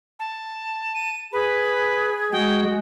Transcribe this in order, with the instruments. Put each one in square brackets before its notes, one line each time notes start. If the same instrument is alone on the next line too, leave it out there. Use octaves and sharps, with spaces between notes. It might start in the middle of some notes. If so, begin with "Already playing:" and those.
[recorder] A5
[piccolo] D#7
[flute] G#4 [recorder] B4 [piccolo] B5
[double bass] G#3 [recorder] F#4 [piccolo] G5